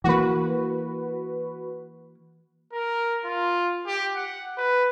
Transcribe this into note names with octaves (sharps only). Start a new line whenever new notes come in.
E3 A#3 F#4 B4
A#4
F4
G4
F#5
B4